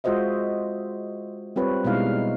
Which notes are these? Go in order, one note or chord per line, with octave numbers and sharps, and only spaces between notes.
G#3 F4 F#4 C5 D#5 E5
G3 C4 F4 B4 C#5
B2 G3 G#3 D#4 E4 F5